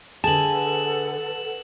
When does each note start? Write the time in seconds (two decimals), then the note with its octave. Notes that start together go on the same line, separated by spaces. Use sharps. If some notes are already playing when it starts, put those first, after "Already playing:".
0.24 D3 G#4 A4 B4 F#5 A5 E7 F#7